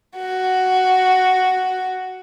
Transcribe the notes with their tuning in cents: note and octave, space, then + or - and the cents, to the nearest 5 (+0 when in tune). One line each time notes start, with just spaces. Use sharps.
F#4 +5